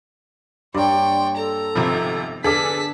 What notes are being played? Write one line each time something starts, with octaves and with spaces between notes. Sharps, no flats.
G2 A#3 C#5 D5 G5 C6
A4 A#5
G#1 C3 F3 B3 D#4 C5
D3 G#4 A4 B4 F5 A5 D6 B6